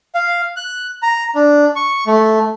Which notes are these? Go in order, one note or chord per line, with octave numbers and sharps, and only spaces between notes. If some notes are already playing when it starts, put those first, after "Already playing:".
F5
F#6
A#5
D4
C#6
A3